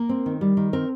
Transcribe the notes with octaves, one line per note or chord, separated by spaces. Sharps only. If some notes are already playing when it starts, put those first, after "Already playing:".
Already playing: A#3 A#4
C4
D#3
G3
D#3
C4 A#4